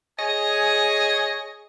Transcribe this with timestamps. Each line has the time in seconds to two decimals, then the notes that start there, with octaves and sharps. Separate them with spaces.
0.19 G#4 C#5 D#5 G#5